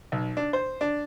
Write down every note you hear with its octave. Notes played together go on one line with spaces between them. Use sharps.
B1
D4
C5
D4